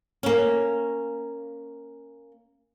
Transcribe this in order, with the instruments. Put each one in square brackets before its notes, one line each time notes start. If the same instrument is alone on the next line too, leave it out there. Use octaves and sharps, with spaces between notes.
[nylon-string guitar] A#3 C#4